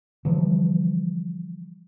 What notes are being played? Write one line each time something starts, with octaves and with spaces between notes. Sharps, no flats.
D3 E3 F3 G3